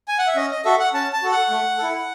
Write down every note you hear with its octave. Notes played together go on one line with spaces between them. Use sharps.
G#5
F#5
E5
C#4 D#5
D#5
F#4 A4 E5
F#5
C#4 A5
A5
F#4 A4
F#5
A3
E4 A4